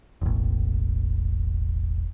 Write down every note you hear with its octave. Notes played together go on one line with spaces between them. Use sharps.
E1 A1